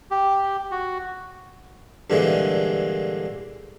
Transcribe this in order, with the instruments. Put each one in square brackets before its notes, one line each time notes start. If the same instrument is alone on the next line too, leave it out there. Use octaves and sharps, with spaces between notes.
[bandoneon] G4
F#4
[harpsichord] G2 A#2 D3 E3 G#3